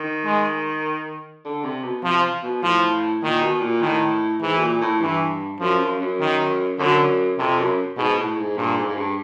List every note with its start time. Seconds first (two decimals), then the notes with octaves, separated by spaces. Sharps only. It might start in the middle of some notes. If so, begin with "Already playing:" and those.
Already playing: D#3
0.25 G#3
1.45 D3
1.64 C3
1.84 B2
2.03 C3 F3
2.43 B2
2.63 A2 F3
3.23 A#2 D#3
3.43 B2
3.62 A#2
3.81 A2 D#3
4.41 G#2 E3
4.57 B2
4.61 A#2
4.81 A2
5.01 G2 E3
5.60 F#2 F3
5.80 F#2
6.00 F#2
6.20 D#3
6.79 F#2 D3
7.38 F2 C3
7.59 F#2
7.97 G#2 B2
8.18 A2
8.37 G#2
8.57 G2 A#2
8.77 G#2
8.89 G#2
8.97 G2